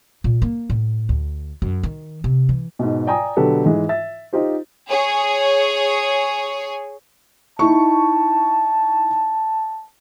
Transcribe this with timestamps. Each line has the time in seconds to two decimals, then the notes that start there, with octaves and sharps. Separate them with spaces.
0.24 A#2
0.42 A#3
0.70 A2
1.09 D2
1.62 F#2
1.83 D#3
2.24 C3
2.49 E3
2.79 G#2 B2
3.07 D5 G5 G#5 A#5 D#6
3.36 B2 D3 F#3 G4 A4 B4
3.65 G#2 E3 G#3
3.89 E5 A6
4.33 D#4 F4 G4 C5
4.89 G#4 C#5
7.59 D#4 E4 A5 C#6